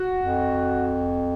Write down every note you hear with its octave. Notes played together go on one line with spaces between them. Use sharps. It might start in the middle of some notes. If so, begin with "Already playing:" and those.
Already playing: F#4
F2